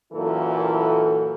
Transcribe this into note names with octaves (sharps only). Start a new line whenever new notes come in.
F#2 A#2 E3 E4 A4